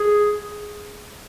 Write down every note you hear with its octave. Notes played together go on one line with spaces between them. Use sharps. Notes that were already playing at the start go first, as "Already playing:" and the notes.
Already playing: G#4